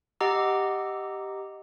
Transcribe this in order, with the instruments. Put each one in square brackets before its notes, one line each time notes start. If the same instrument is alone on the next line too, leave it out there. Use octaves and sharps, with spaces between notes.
[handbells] G4 D#5 F#5 A#5 D6 E6